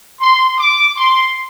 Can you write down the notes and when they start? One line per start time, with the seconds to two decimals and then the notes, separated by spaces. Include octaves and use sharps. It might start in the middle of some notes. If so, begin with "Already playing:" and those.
0.20 C6
0.59 D6
0.96 C6